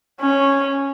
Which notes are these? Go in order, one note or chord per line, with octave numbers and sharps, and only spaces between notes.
C#4